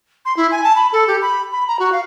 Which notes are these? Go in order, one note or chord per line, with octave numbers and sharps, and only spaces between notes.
C6
E4
G#5
A5
B5
A4
G4
B5
B5
A#5
F#4
F5